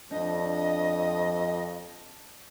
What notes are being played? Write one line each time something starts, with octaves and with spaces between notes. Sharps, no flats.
F2 D4 D#5